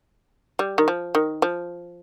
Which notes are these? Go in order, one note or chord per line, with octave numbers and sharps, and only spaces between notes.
G3
D#3
F3
D#3
F3